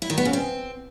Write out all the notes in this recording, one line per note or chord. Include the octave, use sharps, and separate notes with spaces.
E4
D#3
B3
C#3
C4